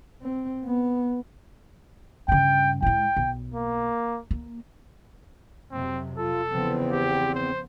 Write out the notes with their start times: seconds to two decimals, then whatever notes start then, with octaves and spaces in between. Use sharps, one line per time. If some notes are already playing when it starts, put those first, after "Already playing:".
0.22 C4
0.64 B3
2.28 G2 C#3 G5
2.82 A2 G#3 G5
3.17 B1
3.54 A#3
4.31 A#3
5.71 F2 C3 F#3 C4
6.18 F4 A4
6.50 E2 C#3 F3 B3 C4
6.92 G4
7.35 C5